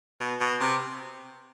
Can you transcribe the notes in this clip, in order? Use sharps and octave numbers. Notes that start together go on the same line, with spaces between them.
B2
B2
C3